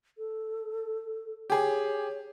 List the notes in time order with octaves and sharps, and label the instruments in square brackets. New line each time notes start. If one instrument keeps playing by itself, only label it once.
[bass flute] A4
[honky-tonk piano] G4 G#4 [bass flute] C#5